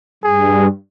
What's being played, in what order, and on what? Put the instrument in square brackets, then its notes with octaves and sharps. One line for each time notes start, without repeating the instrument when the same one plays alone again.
[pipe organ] G2 [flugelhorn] G#4